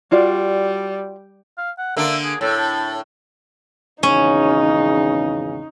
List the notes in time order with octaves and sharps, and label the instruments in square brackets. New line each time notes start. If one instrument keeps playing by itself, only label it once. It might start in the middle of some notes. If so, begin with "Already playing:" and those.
[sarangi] G3 [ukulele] F4 F#4 D5
[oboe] F5
F#5
[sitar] D3 A#3 D4 [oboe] E5
[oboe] G#4
[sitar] A2 [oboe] A4
[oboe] A5
[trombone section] G#1 E2 C#3 [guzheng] C#4 [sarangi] D#4